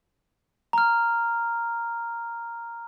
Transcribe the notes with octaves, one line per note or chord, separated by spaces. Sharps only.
A#5 F6